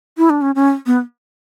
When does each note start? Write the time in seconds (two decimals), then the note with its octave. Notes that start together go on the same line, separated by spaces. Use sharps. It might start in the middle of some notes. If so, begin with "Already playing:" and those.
0.17 E4
0.30 D4
0.41 C#4
0.55 C#4
0.86 B3